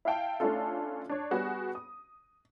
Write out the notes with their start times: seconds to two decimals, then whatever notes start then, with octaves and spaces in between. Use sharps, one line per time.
0.05 E4 E5 F5 G5 A5
0.40 A3 C#4 D4 E4 F4 A4
1.09 D4 C#5
1.31 G3 B3 F#4 G#4
1.75 D#6